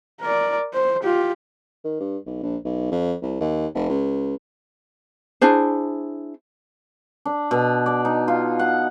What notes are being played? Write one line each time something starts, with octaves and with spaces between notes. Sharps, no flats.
A#4 D5
C5
F4 G4
D#3
G2
B1
A#1
B1
F2
C2
D#2
F1
C#2
D4 E4 G#4 C5
D4
B2
D5
D#4
F4
F#5